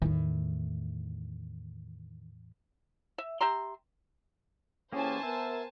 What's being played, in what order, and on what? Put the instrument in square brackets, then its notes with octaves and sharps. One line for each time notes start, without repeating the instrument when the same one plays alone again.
[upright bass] E2 A2 [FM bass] D#3
[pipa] E5
G4 E5 A#5 C6
[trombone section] E3 C#4 [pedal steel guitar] A#3 G4 G#4 [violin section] C5 G#5 A5
[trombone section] B3 A#4 [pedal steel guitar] E5